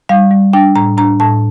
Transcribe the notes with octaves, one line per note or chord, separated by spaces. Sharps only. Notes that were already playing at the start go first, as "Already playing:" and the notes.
G3 F5
G3
D4 G5
A2 A#5
D4 A#5
A2 A5